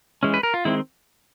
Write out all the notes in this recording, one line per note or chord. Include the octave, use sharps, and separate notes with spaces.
E3 G#3 C#4
B4
A#4
F4
D#3 G#3 C4 E4